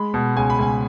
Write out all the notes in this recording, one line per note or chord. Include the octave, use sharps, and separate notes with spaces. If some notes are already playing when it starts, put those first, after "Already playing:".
Already playing: G#3 B5
B2
C#2 G#5
B5
C#2 G#5